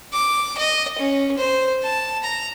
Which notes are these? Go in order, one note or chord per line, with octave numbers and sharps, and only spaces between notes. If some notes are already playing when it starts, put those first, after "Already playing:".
D6
D#5
C#4
C5
A5
A#5